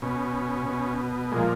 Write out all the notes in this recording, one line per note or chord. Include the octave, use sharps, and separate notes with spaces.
B2 C#4
B2
A#2 F3 G#3